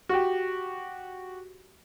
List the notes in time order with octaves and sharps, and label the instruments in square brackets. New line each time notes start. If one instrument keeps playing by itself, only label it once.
[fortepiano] F#4 G4